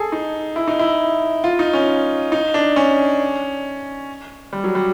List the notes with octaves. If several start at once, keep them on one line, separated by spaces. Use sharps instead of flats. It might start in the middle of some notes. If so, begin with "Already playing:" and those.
Already playing: G#4 A4
D#4
E4
D#4
E4
F4
D#4
C#4
D#4
D4
C#4
G3
F#3
G3